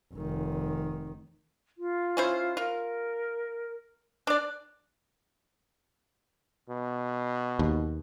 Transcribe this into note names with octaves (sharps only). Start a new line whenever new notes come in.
F1 D#3
F4
C#4 E4 C5
F4 A#4
D4 D5 F#6
B2
D#2